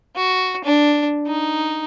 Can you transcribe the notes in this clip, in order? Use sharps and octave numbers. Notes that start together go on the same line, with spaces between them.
F#4
D4
D#4